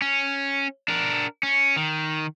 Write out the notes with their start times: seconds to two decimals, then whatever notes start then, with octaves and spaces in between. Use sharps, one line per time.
0.02 C#4
0.88 D4 A#4
1.43 C#4
1.76 D#3